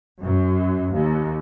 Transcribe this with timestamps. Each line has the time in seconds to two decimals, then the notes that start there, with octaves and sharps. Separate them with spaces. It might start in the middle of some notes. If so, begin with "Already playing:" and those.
0.22 F#2
0.93 D#2